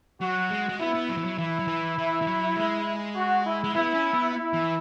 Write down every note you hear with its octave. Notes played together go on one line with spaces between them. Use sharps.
F#3 F#4
G#3
G#3
B3 E4
B3
F#3
E3
F#3
E3 E4
F#3
E3
E3
E3
F#3
G#3
F#4
E4
G#3
B3 E4
C#4
B3
E4
E3